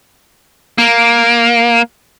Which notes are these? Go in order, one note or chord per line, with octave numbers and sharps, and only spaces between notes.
A#3